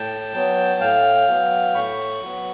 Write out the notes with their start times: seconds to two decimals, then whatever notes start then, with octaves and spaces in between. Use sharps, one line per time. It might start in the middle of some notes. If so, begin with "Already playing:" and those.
Already playing: A2 G5 A5
0.34 F#3 B3
0.81 A2 F5 G5
1.28 F#3 B3
1.74 A2 B5 C#6
2.22 F#3 B3